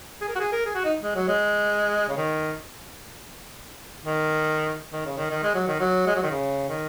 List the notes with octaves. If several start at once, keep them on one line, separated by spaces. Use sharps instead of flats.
G#4
A#4
F#4
G#4
A#4
G#4
F#4
D#4
G#3
F#3
G#3
C#3
D#3
D#3
D#3
C#3
D#3
D#3
G#3
F#3
D#3
F#3
G#3
F#3
D#3
C#3
D#3